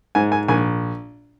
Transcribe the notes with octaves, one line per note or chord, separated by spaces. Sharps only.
G#2 G#5
G#5
A#1 G#5